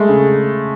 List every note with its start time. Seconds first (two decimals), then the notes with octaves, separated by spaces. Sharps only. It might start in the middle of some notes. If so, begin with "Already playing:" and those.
Already playing: G#3 A3
0.09 C#3